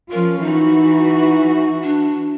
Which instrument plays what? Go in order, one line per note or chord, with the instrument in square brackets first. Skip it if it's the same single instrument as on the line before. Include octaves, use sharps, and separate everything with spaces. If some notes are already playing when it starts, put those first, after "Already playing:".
[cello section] F3 C#4 F4 [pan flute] A#4
[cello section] E3 F#4 [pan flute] D#4
[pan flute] D4